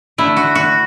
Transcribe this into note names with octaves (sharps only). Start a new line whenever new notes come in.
D3 A3 E4
F#4
F#4